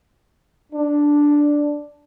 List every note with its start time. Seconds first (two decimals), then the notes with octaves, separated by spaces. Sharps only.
0.73 D4